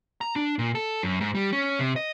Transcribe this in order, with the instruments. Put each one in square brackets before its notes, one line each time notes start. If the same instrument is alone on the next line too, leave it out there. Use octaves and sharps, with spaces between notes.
[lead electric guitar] A#5
D4
A#2
A4
F#2
G#2
G3
C#4
C3
D#5